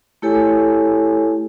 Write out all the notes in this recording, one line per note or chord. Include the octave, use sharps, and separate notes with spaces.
A3 E4 G4 A4 C#5 G#5